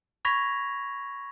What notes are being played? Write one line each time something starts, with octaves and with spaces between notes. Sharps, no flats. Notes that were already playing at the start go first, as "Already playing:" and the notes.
B5 C#6 G#6 A#6 B6 F7